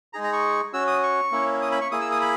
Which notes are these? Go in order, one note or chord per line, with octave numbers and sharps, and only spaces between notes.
G#3 D#4 G#4 A#5
A#5
C#6
C#4 F#4 E6
D#6
C#6
A#3 C#4 E4
D#6
B5
C#6
A#3 E4 G#4 D#6
E6
D#6
B5